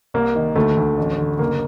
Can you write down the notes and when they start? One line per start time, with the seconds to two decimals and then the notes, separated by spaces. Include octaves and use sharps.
0.14 C2 A#3
0.35 D#3
0.56 D2 A3
0.77 D2
0.97 A1
1.19 D3
1.39 F#1 A#3